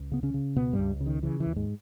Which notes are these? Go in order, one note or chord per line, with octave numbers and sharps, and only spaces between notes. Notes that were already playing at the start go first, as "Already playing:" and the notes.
Already playing: C#2
C#3 B3
C#3 C#4
C#3
C#2 B2 B3
G2 G3
C#2
C#3
D#3
C#3 E3
E3
D#2
G#2 G#3